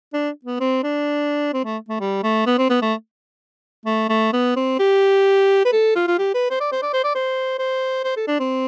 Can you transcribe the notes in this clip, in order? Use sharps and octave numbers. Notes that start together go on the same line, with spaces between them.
D4
B3
C4
D4
C4
A3
A3
G3
A3
B3
C4
B3
A3
A3
A3
B3
C4
G4
B4
A4
F4
F4
G4
B4
C5
D5
C5
D5
C5
D5
C5
C5
C5
A4
D4
C4